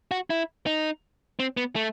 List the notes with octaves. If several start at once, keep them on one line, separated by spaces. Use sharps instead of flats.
F#4
E4
D#4
C4
B3
A3